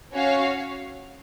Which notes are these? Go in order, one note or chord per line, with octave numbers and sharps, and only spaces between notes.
C#4 F#4 C#5 F5